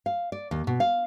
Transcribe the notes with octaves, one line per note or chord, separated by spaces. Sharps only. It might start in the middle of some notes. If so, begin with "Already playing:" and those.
F5
D5
D#2
B2
F5